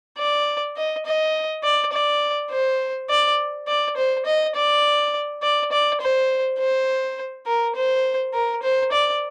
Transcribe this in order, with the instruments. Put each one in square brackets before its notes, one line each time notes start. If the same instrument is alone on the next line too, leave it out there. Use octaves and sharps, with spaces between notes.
[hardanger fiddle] D5
D#5
D#5
D5
D5
C5
D5
D5
C5
D#5
D5
D5
D5
C5
C5
A#4
C5
A#4
C5
D5